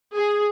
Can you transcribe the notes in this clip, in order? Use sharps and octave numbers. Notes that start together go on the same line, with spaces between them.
G#4